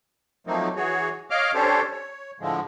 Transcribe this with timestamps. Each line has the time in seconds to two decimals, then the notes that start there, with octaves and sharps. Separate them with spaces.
0.47 F3 F#3 A3 A#3 C4 D#4
0.76 E3 F#4 G#4 C#5
1.30 C#5 D#5 F5 D6 F6
1.54 C#4 D4 G4 A4 C5 C#5
1.91 C#5
2.40 A2 D3 F3 G#3